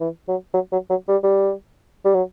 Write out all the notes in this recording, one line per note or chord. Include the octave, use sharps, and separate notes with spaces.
E3
F#3
F#3
F#3
F#3
G3
G3
G3
F#3